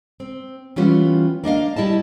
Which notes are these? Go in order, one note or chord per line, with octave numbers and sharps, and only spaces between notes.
C4
E3 G3 B3 C#4 F4
A#3 D4 D#5 F5
G3 E4 D#5 A5